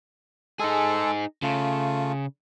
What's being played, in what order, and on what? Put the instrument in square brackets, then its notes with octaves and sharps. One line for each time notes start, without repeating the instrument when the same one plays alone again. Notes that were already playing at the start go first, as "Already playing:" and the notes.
[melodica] G#3 A4 [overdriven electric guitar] D#4 G#4
[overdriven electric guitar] C#3 [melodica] A3 F4